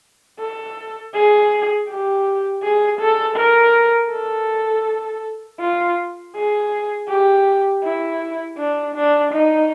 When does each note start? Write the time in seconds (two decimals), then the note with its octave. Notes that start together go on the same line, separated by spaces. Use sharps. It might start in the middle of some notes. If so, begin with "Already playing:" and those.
0.40 A4
1.15 G#4
1.89 G4
2.63 G#4
3.00 A4
3.37 A#4
4.11 A4
5.60 F4
6.35 G#4
7.09 G4
7.83 E4
8.58 D4
8.95 D4
9.32 D#4